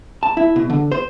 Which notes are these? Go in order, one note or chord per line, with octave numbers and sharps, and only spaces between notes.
A5
E4
B2
D3
C5